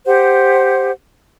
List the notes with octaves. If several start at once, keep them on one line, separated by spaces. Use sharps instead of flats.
G4 C5 F#5